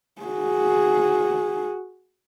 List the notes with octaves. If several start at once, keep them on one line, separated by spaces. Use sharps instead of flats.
F#4 G#4